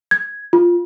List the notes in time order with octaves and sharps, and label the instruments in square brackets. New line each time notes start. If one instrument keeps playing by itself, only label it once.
[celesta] G#6
F4